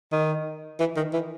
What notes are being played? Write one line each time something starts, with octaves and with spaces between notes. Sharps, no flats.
D#3
E3
D#3
E3